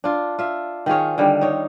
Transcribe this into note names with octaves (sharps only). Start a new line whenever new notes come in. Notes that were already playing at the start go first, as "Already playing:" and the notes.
D4 F4
F4 E5
D#3 F4 G#4 C#5
D3 D#3 G3
D#4 C#5